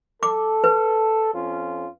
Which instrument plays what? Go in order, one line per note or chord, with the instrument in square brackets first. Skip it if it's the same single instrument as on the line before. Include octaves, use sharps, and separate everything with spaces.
[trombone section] A4 [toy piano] D6
[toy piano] B4
[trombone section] F2 C#4 F4